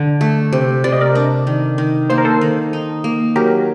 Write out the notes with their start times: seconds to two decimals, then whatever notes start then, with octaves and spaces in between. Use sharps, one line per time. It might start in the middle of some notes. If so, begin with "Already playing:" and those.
Already playing: D3
0.21 A3
0.53 C3
0.84 C3 D5
0.92 D#5
1.01 A#4 D5
1.15 D4
1.47 D#3
1.78 D#3
2.10 A#3 C5
2.18 A#4
2.25 A4 C5
2.41 D#3
2.73 D#4
3.04 A#3
3.36 F#3 G4 A#4